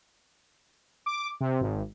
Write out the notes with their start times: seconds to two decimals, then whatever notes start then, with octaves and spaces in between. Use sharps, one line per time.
1.06 D6
1.40 C3
1.61 G#1